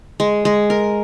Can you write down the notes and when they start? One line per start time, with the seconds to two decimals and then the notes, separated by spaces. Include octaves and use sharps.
0.20 G#3
0.45 G#3
0.70 A#4